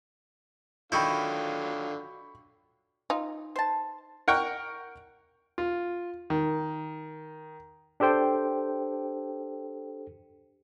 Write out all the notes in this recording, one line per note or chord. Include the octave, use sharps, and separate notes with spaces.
D3 D#3 F#3 E4 F4 B5 C#6 G6
D#4 F4
C5 A5
A#4 F#5 G5 C#6
F4
D#3
D4 G4 A4 C5 G5